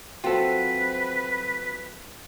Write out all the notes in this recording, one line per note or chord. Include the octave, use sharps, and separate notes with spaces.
F#3 C4 F4 F#4 A4 B4 G5